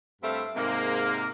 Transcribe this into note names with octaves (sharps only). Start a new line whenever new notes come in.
G2 G3 A3 C4 E5 F5
G#2 C3 G#3 A#3